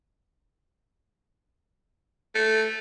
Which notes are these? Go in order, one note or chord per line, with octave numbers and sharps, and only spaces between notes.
A3